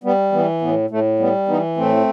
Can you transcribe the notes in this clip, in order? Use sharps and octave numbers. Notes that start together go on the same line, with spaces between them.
G3 B3
E3 B3
A2 B3
A2 A3
G3 B3
E3 B3 D#4
A2 A3 C4